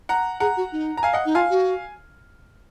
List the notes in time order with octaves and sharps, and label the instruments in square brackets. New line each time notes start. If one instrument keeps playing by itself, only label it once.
[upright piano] F#5 A#5
[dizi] G#4 [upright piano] F#5 A#5
[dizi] F#4
D#4
[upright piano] A#5
F5 G#5
D#5 F#5
[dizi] D#4
[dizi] F4 [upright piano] F5 G#5
[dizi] F#4